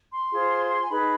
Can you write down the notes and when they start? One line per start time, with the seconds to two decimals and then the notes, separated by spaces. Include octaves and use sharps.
0.12 C6
0.30 F4 G#4 C5
0.82 G#5
0.89 D#4 G#4 B4 B5